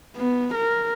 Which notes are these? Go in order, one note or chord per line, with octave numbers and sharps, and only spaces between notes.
B3
A#4